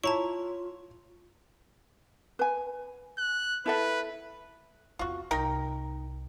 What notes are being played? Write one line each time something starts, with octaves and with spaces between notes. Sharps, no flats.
E4 F4 C#5 A5 A#5 C#6
B4 G#5
F#6
E4 A4 B4 E5
E2 C4 F4 F#4
C2 D#4 A#4 G5